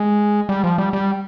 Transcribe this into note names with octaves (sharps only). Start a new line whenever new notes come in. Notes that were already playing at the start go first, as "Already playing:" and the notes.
Already playing: G#3
G3
F3
G3
G3